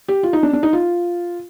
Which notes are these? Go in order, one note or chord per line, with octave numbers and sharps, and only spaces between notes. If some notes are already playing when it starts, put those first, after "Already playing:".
G4
F4
D#4
D4
D4
D#4
F4